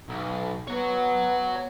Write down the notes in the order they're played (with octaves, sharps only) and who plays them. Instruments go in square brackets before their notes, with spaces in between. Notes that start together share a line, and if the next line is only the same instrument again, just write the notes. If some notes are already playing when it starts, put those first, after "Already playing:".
[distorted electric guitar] B1
[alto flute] B3 [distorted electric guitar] C#5 F#5